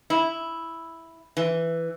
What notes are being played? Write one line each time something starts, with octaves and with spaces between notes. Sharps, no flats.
E4
E3